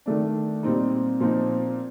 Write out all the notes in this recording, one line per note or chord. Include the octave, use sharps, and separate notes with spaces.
D#3 A3 D4
A#2 G3 C4 D#4
A#2 F3 C4 D#4